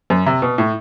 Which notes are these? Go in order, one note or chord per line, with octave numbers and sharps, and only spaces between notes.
F#2
C3
B2
A2